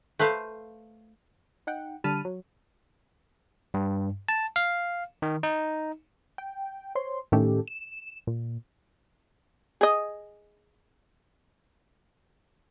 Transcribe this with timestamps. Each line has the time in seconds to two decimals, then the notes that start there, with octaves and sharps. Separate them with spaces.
0.19 A3 B4 C5 F5
1.67 D#4 F#5 G5
2.04 D3 G3 A5 B5 F6 D#7
2.25 F#3
3.74 G2
4.29 A5
4.56 F5
5.22 D#3
5.43 D#4
6.38 G5
6.95 C5 C#5 C6
7.32 A2 D#3 A3 C#4 G4 A4
7.68 E7
8.27 A#2
9.81 G#4 D#5